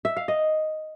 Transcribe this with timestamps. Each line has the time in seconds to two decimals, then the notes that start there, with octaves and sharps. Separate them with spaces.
0.05 E5
0.17 F5
0.28 D#5